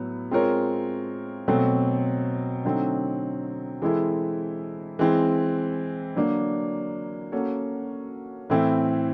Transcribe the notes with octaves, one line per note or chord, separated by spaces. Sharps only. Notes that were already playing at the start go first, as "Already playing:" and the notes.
Already playing: A2 F#3 B3 E4
G#3 C4 F4 A#4 C#5
B2 F#3 A3 C4
D3 F#3 A3 C4 D#4
E3 G#3 C4 E4 A4
E3 G#3 C4
D3 F#3 A#3 D4
A#3 C#4 F#4 A4 C#5
A2 E3 A3 C4 E4